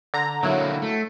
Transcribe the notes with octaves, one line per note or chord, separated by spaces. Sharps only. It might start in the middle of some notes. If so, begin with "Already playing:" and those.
D3 A#5
D3 F#3 A#3 E4
A3